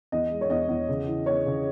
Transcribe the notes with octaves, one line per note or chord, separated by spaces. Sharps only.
E2 D#5
G#3
C#5
E2 D#5
E2
C#3
E3
B3 C#5
C#3